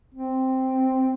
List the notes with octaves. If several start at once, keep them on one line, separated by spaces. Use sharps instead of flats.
C4